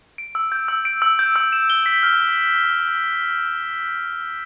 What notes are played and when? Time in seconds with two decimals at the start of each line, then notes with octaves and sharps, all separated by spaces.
0.18 D7
0.35 E6
0.52 G6
0.68 E6
0.85 D7
1.02 E6
1.19 G6
1.36 E6
1.53 E7
1.70 G7
1.86 B6
2.03 F6